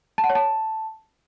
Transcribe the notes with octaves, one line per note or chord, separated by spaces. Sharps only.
A5
F#5
C#5
A5